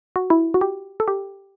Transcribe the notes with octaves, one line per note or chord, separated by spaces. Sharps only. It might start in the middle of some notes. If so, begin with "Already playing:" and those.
F#4
E4
F#4
G4
A4
G4